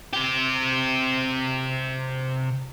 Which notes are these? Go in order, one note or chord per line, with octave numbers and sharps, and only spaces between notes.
C3 G4